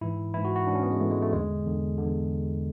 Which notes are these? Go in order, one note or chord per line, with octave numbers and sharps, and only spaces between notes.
G#2 E3 E4
G#2 E3 E4
F#4
F#4
G#2 E3 D4
C#4
B3
G#3
G#2 E3 A3
G#3
A3
E2 D3 G#3
E2 D3
E2 D3